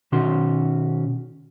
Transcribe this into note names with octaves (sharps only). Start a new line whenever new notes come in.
B2 D#3 C#4 F#4 C6